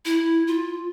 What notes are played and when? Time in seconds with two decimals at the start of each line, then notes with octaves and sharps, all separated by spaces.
0.05 E4
0.47 F4